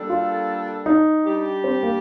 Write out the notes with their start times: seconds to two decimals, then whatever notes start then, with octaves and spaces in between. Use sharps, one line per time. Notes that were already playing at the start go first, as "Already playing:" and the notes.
Already playing: G3 A#3 D4 A4
0.10 F4
0.86 D#4
1.25 G3 D4 G4
1.64 C4
1.83 A#3